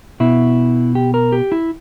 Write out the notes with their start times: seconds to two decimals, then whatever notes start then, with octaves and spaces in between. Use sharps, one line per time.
0.20 B2 E4
0.95 G4
1.14 A#4
1.32 G4
1.52 E4